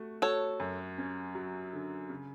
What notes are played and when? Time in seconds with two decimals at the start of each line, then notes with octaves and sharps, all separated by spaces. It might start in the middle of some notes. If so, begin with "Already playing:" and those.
Already playing: A3 F#4
0.22 F#4 A4 C#5
0.60 F#2
0.98 C#4
1.35 F#3
1.73 D3
2.10 C#3